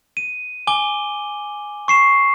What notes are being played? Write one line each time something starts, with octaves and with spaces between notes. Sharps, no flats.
D#7
G#5 D6 G7
C#6 C7 E7